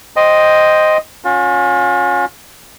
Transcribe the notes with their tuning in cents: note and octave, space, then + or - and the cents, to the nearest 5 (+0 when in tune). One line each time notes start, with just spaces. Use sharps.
C5 +0 D#5 +0 G5 +0
C#4 +0 F4 +40